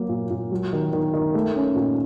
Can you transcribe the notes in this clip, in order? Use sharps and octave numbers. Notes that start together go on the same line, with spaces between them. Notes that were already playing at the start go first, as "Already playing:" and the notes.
Already playing: F#3 A#3
A#2
A#2
F#3
D#3
D#3
D#3
A3
C#4
A#2